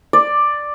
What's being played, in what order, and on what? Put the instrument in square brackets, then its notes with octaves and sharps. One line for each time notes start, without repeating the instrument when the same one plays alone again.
[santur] D5